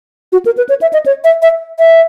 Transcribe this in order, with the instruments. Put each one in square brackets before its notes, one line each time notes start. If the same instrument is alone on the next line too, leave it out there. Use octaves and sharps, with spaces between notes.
[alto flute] F#4
A#4
B4
C#5
E5
D#5
C#5
E5
E5
E5